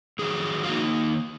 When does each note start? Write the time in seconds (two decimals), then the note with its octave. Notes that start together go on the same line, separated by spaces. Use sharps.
0.19 F2 D#3 F#3 G#4
0.63 F4
0.68 D#3 A#3 D#4 F#4